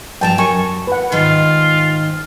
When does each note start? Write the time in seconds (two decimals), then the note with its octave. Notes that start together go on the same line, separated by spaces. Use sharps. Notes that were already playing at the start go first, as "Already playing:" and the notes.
0.21 G2 F3 G5 A5 A#5
0.38 F#2 F#3 G#5 C#6
0.87 B4 F#5
1.12 G#2 D#3 F4